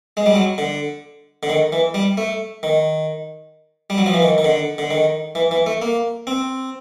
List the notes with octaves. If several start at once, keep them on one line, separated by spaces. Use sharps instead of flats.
G#3
G3
F#3
D3
D3
D#3
E3
G3
A3
D#3
G3
F#3
F3
E3
D#3
D#3
D3
D3
D#3
E3
E3
A3
A#3
C4